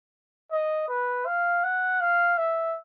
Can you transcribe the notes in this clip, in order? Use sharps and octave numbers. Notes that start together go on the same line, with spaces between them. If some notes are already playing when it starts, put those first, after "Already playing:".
D#5
B4
F5
F#5
F5
E5